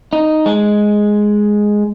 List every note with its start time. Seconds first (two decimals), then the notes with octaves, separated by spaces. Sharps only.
0.13 D#4
0.46 G#3